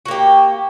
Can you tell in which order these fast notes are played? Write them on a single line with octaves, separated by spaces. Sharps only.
F#4 A#3 G4